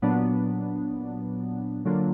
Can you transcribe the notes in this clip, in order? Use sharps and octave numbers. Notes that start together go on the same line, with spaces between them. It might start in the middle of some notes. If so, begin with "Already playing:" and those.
A#2 F#3 B3 D4
D3 F#3 A#3 D4 F4